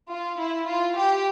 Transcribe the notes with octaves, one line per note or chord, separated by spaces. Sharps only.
F4
E4
F4
G4